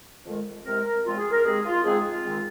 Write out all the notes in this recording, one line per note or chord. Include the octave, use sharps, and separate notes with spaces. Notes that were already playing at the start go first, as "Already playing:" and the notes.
F2 D#3 G#3
C2 C3 G#3 C4 A#4
A#4
A#2 F3 G#3 C4 F4
G#4
A#4
D#2 D#3 G#3 C4 G#4
F4
G#2 F3 G#3 C4 G#4
F4
G#2 D#3 G#3 C4